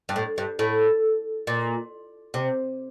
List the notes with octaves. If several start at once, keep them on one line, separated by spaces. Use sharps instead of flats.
G2
A2
G2
A2
A#2
C3